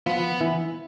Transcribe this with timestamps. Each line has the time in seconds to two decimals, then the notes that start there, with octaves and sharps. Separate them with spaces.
0.06 F3 B3 F4
0.41 E3 E4